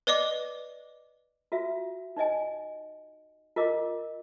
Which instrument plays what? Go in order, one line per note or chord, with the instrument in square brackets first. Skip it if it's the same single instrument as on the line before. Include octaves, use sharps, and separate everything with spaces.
[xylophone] B4 D5 D#5 D6
[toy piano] F4 F#4 E5
D#4 D5 D#5 G#5
F4 A#4 D#5 D6